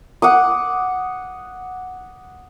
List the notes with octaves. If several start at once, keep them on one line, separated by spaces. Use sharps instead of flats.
F#5 D6 D#6